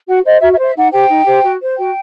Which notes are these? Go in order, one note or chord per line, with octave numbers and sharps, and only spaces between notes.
F#4 F#5
C5 D#5
F#4 E5
E5
C5
E5
D#4 F#5
G4 C5 G5
D#4
G4 C5
F#4
C5
F#4 G5